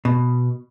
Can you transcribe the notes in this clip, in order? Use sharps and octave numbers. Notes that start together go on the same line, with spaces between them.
B2